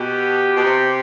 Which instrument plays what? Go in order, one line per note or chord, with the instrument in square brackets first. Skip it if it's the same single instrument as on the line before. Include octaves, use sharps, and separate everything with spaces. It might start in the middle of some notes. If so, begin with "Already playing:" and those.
Already playing: [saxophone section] B2 [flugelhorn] G4
[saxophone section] B2
C3